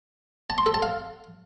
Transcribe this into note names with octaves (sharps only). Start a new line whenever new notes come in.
A5
C6
A4
A5
F5